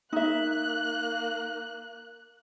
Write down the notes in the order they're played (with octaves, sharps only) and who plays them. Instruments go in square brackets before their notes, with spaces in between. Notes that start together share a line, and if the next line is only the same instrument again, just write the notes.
[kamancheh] A#3 F#6 [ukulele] D#4 E5